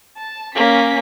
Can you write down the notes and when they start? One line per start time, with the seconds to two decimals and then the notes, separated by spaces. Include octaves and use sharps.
0.16 A5
0.55 A#3 C#4 B6